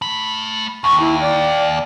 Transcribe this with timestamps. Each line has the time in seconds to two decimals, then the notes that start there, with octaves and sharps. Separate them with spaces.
0.02 A3 B5
0.84 D#2 C#6
1.00 E4
1.21 D5